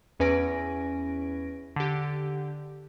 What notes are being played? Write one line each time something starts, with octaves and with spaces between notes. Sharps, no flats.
E2 C#4 B4 G#5 A#6 D7
D3 G4